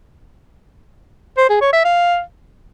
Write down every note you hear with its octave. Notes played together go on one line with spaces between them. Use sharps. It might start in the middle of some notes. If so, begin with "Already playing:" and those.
C5
G#4
C#5
E5
F5